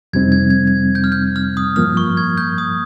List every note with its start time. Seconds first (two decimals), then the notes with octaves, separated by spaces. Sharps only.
0.13 F2 C3 G3 C4 D#4 G#6
0.32 G#6
0.50 G#6
0.67 G#6
0.95 G6
1.04 F6
1.12 G6
1.36 F6
1.57 D#6
1.76 G2 F3 A#3 F6
1.97 C#6
2.17 G#6
2.37 G6
2.58 D#6